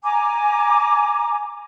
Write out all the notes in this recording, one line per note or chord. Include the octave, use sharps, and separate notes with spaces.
G#5 A#5 D6